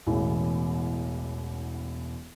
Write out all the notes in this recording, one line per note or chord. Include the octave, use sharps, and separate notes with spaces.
E1 A1 E2 E3